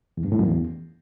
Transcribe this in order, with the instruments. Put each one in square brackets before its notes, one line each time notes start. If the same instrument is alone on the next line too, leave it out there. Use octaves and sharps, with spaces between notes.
[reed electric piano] E2
G2
A2
F#2
E2